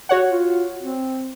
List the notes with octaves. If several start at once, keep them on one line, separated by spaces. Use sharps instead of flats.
F#4 C#5 F#5
F4
C4